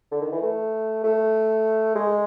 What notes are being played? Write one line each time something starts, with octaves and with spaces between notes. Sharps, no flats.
D3
D#3
E3
A3
A3
G#3